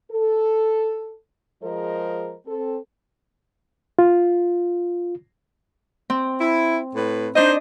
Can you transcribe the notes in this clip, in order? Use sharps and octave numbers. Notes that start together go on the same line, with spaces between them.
A4
F3 G#3 G#4 A#4 C5 D#5
C4 A4
F4
C4
E4
A2 B4
D4 D#4 C5 D#5